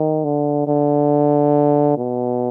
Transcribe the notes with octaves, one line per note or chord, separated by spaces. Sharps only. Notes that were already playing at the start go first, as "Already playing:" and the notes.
Already playing: D#3
D3
D3
B2